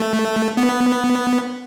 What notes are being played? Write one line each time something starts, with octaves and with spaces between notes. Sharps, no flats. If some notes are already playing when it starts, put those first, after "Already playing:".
Already playing: A3
B3